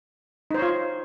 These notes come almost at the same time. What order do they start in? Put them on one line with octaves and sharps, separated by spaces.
D#4 C5 C#5 F4